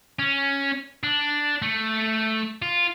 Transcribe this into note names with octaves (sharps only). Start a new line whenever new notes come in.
C#4
D4
A3
F4